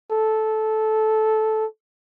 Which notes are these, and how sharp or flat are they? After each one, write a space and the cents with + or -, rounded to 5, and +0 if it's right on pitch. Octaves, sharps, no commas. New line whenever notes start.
A4 -15